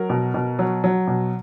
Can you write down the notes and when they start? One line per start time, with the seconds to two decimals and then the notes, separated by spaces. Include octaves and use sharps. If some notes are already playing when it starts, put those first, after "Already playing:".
Already playing: F#3 A#4
0.10 B2
0.34 B2
0.59 F#3
0.84 F#3
1.07 B2